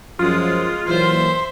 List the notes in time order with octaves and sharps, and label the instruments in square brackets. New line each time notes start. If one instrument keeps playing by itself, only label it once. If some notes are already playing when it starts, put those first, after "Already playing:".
[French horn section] F#2 F3 [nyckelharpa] G#3 D#6 [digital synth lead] F4
[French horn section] A#2 E3 F#3 [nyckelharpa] C5 E5 [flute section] C6